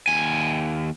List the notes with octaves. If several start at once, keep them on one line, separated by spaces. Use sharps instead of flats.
D#2 G#5